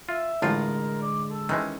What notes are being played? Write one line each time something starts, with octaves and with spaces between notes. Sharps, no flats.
F4 E5
A1 A2 D3 G#3 F4 A#4
D5
A4
D#3 E3 G#3 C#4